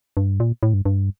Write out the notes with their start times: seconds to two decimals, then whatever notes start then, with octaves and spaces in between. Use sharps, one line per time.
0.17 G2
0.40 A#2
0.63 A2
0.74 G2
0.85 G2